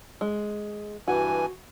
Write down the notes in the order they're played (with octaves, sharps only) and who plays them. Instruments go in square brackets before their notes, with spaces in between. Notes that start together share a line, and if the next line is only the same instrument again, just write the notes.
[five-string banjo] G#3
[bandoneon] G2 E3 G#5 [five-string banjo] F#4